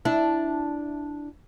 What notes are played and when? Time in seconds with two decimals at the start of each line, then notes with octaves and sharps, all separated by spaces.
0.05 D4 E4